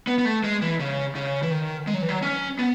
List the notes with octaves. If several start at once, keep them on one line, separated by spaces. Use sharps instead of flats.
B3
B3
A3
G#3
E3
C#3
C#3
E3
D#3
G#3
F#3
E3
F#3
C#4
B3